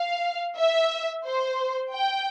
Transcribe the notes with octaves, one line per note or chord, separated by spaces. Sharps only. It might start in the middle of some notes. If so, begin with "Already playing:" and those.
Already playing: F5
E5
C5
G5